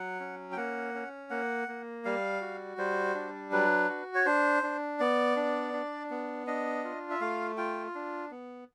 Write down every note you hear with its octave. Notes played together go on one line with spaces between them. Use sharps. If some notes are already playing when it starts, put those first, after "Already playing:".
Already playing: F#3 F#5
C#4
G5
A#3 F#5
C#4
A#3 F#5
A#3
G3 F5
F#4
G3 C5
D4
F#3 B4
F#4
C#5
D4 C5
D4
B3 D5
D4
D4
B3
D4 D#5
F4
E5
A3 F5
F4 G5
D4
B3